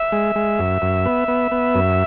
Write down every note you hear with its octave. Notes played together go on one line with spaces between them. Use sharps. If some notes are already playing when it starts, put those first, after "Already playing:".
Already playing: E5
G#3
G#3
F#2
F#2
B3
B3
B3
F#2